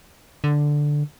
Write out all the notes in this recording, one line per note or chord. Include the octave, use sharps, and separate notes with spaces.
D3